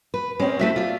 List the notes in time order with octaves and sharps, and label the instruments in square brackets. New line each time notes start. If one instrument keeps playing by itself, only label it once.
[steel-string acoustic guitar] B4
[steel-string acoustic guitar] G#3 [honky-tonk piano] C4 C#4
[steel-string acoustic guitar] A3 C4 F#4 [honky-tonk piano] E4 B6
[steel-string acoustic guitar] F4 D5